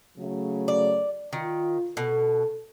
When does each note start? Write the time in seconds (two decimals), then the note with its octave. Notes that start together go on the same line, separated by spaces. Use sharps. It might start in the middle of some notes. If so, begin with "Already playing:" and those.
0.18 C#3 F#3 A3
0.68 D5
1.33 D#3 F4
1.97 B2 A4